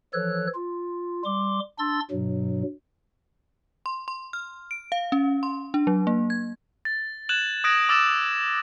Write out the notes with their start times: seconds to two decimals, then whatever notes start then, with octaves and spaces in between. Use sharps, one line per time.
0.14 E3 F3 A4 C#5 F#6
0.54 F4
1.25 G3 C6 D6
1.79 D4 C6 E6 A6
2.11 G2 B2 F#3
3.86 C6
4.08 C6
4.33 F6
4.71 D7
4.92 F5
5.12 C#4
5.43 C6
5.74 D4
5.87 F#3
6.07 A#3
6.30 G#6
6.85 A6
7.29 F#6 G#6 E7 F#7
7.64 D#6 F#6 G#6 A#6 D7
7.89 D6 E6 A6 E7